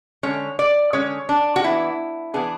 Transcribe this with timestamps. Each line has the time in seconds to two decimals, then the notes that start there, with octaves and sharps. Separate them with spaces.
0.23 D3 G#3 C#4 C#5
0.59 D5
0.93 D3 G#3 C#4 C#5
1.29 D4
1.56 F#4
1.64 E3 B3 D4 E4
2.34 E3 B3 D4 G#4